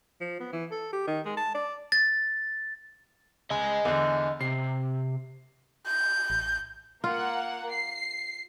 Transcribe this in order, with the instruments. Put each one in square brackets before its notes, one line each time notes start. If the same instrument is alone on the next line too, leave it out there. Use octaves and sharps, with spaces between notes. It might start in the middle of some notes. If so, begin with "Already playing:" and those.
[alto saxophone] F3
B3
E3
A4
G4
D#3
G#3
A5
D5
[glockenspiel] A6
[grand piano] C#2 [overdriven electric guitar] D#5 G#5
[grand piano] E2 D3
[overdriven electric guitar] C3 [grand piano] C7
[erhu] G6
[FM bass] A1
[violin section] A#3 F#5 [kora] F4
[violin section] C7